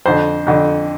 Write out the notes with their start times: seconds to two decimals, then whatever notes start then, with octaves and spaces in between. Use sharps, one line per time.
0.06 F2 D3 C5
0.47 F2 D3